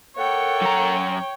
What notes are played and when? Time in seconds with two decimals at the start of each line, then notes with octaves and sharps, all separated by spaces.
0.17 A#3 A4 C#5 F#5 G5
0.61 F#2 A#5